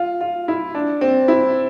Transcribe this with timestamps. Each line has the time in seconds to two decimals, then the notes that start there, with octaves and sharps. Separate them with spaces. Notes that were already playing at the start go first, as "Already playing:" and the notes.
Already playing: F4
0.21 F4
0.48 E4
0.75 D4
1.01 C4
1.28 E4